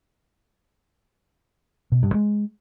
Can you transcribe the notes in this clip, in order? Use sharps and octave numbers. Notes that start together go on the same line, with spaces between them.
B2
G2
G#3